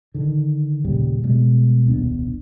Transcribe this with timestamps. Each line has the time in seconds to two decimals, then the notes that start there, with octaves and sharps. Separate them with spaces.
0.14 D3 D#3
0.85 D#2 A#2 C#3 G3
1.24 B2 G3 G#3
1.86 D#1 C2 B3 D4